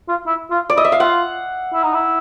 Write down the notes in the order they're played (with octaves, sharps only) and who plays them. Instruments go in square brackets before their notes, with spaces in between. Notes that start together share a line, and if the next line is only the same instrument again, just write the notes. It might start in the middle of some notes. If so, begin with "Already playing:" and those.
[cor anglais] F4
E4
F4
[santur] D5
[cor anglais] E4 [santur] D#5
[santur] E5
F5
[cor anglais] F4 [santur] F#5
[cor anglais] E4
D#4
E4